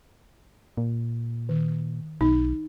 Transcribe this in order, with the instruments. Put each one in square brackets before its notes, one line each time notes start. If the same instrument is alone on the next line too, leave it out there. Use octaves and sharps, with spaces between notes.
[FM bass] A#2
[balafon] D#3
[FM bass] B1 [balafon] D#4